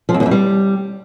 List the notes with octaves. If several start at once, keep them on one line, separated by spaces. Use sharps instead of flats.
F3
F2
E2
F2
G3